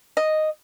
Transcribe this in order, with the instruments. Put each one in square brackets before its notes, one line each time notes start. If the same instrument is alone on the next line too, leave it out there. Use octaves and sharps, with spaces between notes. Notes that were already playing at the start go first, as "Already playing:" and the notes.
[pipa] D#5